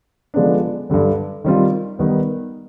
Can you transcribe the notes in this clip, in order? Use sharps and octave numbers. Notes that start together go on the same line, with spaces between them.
D3 F3 G#3 B3 D4
G2 D3 G3
D#3 G3 C4 F4
D#3 G3 B3